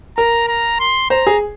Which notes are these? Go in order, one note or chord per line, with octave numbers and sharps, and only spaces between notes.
A#4 A#5
A#5
C6
C5 A#5
G#4